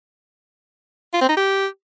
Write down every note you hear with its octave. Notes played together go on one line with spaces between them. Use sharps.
F4
C4
D#4
G4